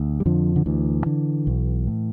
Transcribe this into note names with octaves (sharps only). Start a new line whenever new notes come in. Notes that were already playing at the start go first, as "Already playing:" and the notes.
Already playing: D2
G3
F2 D3 F3
D3
D2 E3
D3
B1
A2